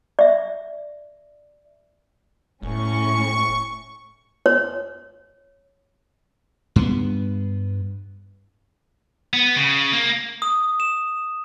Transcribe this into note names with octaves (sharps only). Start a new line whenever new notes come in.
D5 E5
E1 A2 C#4 C#6
C#5
G2 B3
B3
C#3
A#3
D#6
E7